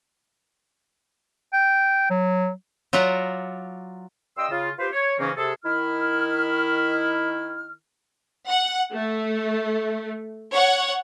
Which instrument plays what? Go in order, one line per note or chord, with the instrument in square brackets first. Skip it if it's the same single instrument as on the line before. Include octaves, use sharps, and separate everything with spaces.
[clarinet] G5
F#3
[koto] F#3 F4 D5 E5 F#5 A#5
[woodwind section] G2 D#5 G5 C6 E6
C#3 F4
F4 G4 B4 C5
C#5
G#2 C#3 E3 A#3 C4 C#4
C3 G#4 A4
D#3 E4 F6
[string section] F#5
A3
C#5 F#5